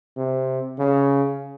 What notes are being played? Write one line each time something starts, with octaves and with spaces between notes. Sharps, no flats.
C3
C#3